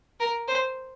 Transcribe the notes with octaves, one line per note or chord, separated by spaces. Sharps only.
A#4
C5